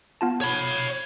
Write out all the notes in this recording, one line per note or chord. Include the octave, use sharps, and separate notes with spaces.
B3 F4 A5
C#5 B5